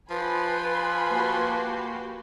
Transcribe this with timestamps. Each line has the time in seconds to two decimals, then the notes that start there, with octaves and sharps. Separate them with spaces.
0.10 F3 B4 G#5 B5 C6
1.09 A#3 F#4 G4